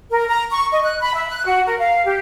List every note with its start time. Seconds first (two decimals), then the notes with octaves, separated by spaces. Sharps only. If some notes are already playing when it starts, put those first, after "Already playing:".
0.11 A#4
0.28 A#5
0.51 C#6
0.72 D#5
0.83 F#6
1.01 B5
1.14 E5
1.30 F#6
1.46 F#4
1.65 A#4
1.79 F5
2.05 G4